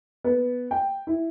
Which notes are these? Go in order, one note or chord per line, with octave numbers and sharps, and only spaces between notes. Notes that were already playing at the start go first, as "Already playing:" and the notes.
B3
G5
E4